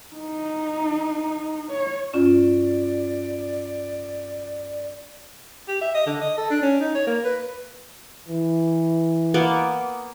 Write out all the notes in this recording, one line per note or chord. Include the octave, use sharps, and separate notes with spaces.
D#4
C#5
G2 C#4 F4 D5
G4
E5
D#5
D3
D#5
A4
D4
C#4
D#4
C#5
A#3
B4
E3
A#3 B3 D6